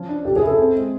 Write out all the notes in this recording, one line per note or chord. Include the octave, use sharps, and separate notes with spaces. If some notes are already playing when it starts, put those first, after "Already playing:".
Already playing: F3 C#4
D4
G4 A4
G#4
E4
A4
C4
G#3